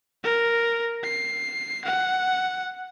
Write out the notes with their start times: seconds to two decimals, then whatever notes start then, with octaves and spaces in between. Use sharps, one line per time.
0.24 A#4
1.04 C7
1.85 F#5